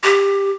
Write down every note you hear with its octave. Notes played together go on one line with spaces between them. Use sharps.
G4